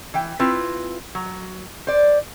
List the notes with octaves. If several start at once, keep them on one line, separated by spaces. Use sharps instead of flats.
E3 G5
C4 E4 F4 B4
F#3
C5 D5